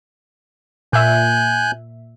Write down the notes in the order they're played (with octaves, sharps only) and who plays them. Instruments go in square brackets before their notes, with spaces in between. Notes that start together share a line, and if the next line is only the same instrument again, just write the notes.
[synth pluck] A#2 E5 [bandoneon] G#5 F#6 G6